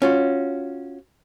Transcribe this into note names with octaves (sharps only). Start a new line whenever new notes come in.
C#4 F4 F#4